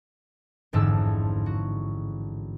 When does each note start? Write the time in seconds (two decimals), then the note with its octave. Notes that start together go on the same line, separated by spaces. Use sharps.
0.73 A1 F2 G#2 D3 A5 E6
1.46 F#4